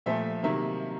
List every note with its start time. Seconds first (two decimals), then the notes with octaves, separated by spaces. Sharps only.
0.06 A#2 F3 A3 E5
0.43 C3 D#3 F#3 A#3 E5